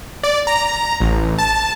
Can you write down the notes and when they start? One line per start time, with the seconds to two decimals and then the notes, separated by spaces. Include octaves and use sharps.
0.23 D5
0.47 A#5
1.00 A1
1.38 A5